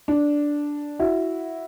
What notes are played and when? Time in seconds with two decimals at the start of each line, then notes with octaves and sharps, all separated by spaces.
0.08 D4
0.99 E4 F#4